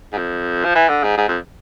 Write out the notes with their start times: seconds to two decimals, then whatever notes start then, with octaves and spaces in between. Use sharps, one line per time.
0.13 G#2
0.17 F2
0.65 F3
0.75 E3
0.89 D3
1.03 G#2
1.17 G#2
1.28 F2